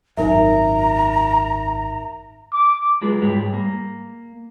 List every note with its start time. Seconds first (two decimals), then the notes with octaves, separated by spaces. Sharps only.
0.17 G#1 F#2 D#4 A#4 E5 A#5
2.53 D6
3.02 F#3 G#3 F4 G#4 B4
3.22 G#2 G3 G#4 C#5
3.54 A#3